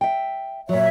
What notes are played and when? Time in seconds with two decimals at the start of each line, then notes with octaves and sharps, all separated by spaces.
0.01 E5 G5
0.69 A#2 F#3 C#5 E5